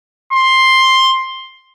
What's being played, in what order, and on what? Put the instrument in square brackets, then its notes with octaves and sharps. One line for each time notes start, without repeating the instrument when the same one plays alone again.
[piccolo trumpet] C6